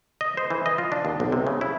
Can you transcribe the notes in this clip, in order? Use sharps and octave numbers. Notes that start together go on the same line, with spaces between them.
D#5
C5
E3
D#5
F4
D4
D#2
B1
C3
C#3
E4